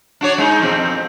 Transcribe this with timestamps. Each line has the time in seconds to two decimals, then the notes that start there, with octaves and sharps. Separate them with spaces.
0.21 D4 F#4 C#5
0.38 G#3 D#4
0.61 F2 B2 C4